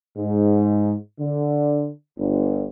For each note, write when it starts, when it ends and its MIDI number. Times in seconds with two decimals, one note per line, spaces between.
0.16 0.92 44
1.18 1.88 50
2.17 2.64 31